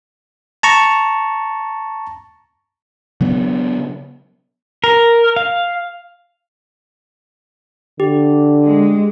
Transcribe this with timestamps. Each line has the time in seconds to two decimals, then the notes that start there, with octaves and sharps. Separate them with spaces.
0.63 A5 A#5 C#6
3.21 C#3 F#3 B3
4.84 A#4
5.36 F5
8.00 D3 G4
8.64 G#3